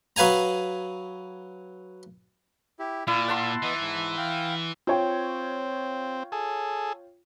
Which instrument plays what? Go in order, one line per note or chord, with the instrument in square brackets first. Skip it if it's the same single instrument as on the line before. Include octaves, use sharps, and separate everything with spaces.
[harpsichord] F#3 B4 F5 G#5 A#5
[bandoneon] E4 G4
[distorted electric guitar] A#2 [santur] E4 [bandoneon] F4 D5
[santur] F#5 A5 C6
[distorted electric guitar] E3 [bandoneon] B3 D#5
[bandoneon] G#2
F5 G5
[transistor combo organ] C4 [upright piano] F4 C#5 G5
[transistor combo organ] G#4 A4